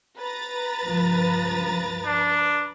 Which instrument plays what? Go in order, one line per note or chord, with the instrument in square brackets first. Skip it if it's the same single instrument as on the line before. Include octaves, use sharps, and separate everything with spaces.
[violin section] B4 A#5 A6
[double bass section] C#2 G2 F3
[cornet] D4